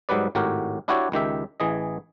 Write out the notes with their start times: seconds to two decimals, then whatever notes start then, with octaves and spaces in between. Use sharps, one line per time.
0.09 G#2 F#3 G3 B4 D5
0.35 G#1 A2 F#4 G4 A#4
0.88 D4 E4 F#4 G4 C#5 D5
1.12 C#2 D#3 G4 E5
1.60 A1 E3 G#4 D#5